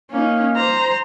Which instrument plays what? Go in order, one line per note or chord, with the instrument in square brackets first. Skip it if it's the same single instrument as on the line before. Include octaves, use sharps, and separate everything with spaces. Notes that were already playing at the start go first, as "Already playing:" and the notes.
[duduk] A#3 [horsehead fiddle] C#4 D#4
[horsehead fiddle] C5 A#5